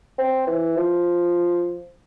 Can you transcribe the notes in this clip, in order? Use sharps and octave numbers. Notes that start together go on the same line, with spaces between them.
C4
E3
F3